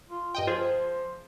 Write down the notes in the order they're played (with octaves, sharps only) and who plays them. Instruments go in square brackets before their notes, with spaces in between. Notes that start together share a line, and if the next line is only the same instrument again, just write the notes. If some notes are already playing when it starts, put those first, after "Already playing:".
[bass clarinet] F4
[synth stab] G2 D#5 G5
[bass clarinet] F3 [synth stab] F4 G#4 [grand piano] C5